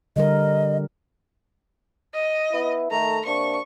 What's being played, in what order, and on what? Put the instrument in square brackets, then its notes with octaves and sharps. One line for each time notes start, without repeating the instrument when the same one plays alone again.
[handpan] D3 G3 A#4 [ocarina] D#5
[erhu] D#5
[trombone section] B3 E4
[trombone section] D#3 A3 [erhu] A#5
[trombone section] C3 A#3 D4 [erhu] C#6